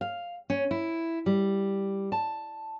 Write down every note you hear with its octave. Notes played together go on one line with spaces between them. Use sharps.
F5
C#4
E4
G3
A5